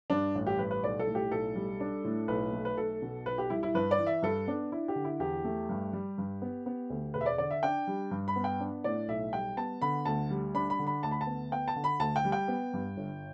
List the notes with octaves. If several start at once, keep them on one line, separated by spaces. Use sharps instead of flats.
G2 D4
A1
G4
G3 B4
B4
B1 D5
A4
A2
G4
B1 A4
G3
D4
A2
B1 B4
A3
B4
B1 A4
B2
B1 B4
G4
G3 E4
E4
G2 B4
D5
E3
E5
G2 A4
B3 D4
D4 E4
G4
D3
E4
E2 G4
A3
G2
G3
G2
B3
B3
D2
E1 B4
E5
D5
D3 D5
E5
D4 G5
G3
G2
B5
B3
G5
D4
A2 D5
B1 E5
G3 G5
B3 A5
D3 B5
D2 A5
G3
D4 B5
B5
D3
B5
D2 A5
B5
A5
B3
B3 G5
A5
D3
B5
D2 A5
G5
G3
G5
B3
G2
G1